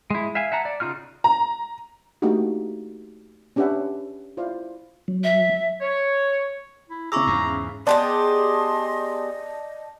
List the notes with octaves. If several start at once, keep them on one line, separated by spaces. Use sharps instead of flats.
G#3 E4
E5 F5 G#5
E5 F#5 A5 A#5
D5
C#3 D#4 F4 F#4 F6
A#5
A3 A#3 D4 D#4 F#4 G4
C#4 D4 G4 B4 E5 F#5
E4 F4 C5 D5 F5
F#3
E5
C#5
E4
C#3 E4 G#4 A#5 C#6 D6 E6
E2 G#2
B3 G4 G#4 D5 D#5 A5 C6